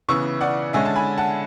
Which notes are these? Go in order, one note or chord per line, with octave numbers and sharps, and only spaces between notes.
C#3 E3 B3 C#6 E6
D5 F#5
D3 G#3 C#4 E5 G#5
A5
G#5 B5
F#5 A5